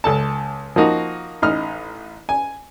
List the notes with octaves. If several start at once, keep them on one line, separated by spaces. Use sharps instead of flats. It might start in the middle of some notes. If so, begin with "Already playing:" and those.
C#2 A4 A5
F3 A#3 D#4 F#4
A1 D#4 F6
G#5